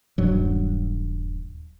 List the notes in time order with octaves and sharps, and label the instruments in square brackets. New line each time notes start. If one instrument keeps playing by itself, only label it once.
[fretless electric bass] D#1 G2 F#3